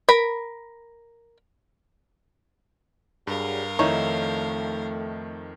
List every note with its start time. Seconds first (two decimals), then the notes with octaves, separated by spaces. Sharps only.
0.09 A#4 B5
3.27 G2 F#3 G3 G#4 A#4 F5
3.79 F2 D#3 A3 D#4 E4 C#5